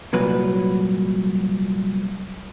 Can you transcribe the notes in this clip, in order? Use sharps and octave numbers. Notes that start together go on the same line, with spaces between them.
C2 A#2 F#3 B4